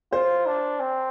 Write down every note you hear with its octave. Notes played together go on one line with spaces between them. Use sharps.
F4 C5
D4
C4